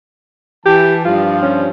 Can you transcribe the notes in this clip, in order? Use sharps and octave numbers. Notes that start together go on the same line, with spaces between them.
E3 G4 A5
G2 F3 F4
C#4